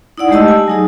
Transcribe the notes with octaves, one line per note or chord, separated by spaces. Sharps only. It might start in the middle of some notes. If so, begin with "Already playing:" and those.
D#4 E4 D5 F#5
G#3 A3 G4 D#5 A5 E6
G#5
F#3 D#4 G#4